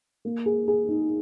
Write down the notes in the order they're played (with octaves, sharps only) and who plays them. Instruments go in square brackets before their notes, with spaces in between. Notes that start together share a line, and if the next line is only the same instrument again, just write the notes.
[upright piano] A#3
G#4
G#4
D#4